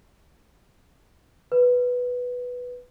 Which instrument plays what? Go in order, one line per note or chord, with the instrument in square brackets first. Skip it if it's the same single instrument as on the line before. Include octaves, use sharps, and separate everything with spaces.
[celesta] B4